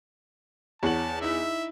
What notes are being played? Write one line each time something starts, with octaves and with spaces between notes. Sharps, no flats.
E2 C#5 F#5 A5 F#7
D#4 E4 E5